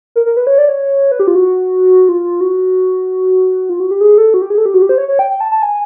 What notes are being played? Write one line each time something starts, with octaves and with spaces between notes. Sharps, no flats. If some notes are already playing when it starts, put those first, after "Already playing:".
A#4
A#4
B4
C#5
D5
C#5
B4
G4
F4
F#4
F4
F#4
F4
F#4
G4
G#4
A4
F#4
G4
G#4
A4
G4
F#4
G4
C5
C#5
C#5
G5
G5
A5
A5
G#5